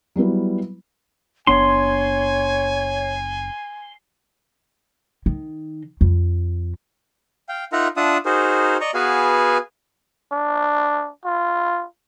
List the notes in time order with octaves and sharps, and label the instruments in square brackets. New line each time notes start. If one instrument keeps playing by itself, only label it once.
[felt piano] F#3 G3 B3 E4
[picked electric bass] F#1 B3 D4 [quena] C#5 [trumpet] G#5 [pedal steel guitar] C6
[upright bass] D#3
F2
[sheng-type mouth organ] F5 G5
D#4 F4 A#4 E5 F#5 A#5
D4 F4 E5 F#5 A5 D#6
D#4 F#4 G#4 A#4 C5
D5 D#5 A#5 C#6
B3 F#4 G#4 B4 F5 G#5
[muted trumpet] D4
F4